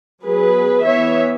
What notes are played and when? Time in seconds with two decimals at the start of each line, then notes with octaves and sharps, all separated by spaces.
0.25 F#3 B3 G#4 B4
0.85 E3 B3 C#5 E5